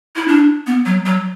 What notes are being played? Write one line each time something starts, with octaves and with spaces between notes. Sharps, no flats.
E4
D4
B3
F#3
F#3